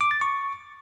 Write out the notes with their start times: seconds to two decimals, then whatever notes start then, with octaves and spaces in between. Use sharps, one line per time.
0.01 D6
0.11 A6
0.21 C#6